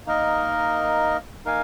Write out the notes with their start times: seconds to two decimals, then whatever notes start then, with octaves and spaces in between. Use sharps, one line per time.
0.06 A#3 D#4 A#4 D#5
1.45 A#3 D#4 A#4 F5 G#5